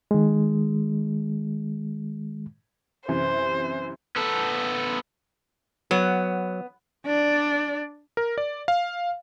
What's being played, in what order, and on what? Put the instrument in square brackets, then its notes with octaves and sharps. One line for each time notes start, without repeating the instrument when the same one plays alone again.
[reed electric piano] D#3 G#3
[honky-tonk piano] F#2 C3 E3 [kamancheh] C5
[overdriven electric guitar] B3 A4
[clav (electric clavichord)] F#3 [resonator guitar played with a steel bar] B3
[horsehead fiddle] D4 D5
[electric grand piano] A#4
D5
F5